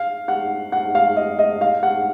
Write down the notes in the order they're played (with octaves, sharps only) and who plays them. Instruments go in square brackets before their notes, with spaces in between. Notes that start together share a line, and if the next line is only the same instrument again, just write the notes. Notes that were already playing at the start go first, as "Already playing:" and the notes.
Already playing: [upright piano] F5
F#5
F#5
F5
D#5
D#5
F5
F#5